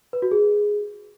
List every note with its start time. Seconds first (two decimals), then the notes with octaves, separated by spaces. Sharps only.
0.13 B4
0.22 F#4
0.32 G#4